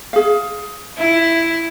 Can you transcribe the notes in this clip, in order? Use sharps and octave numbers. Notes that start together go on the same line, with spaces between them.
G#4 F5
E4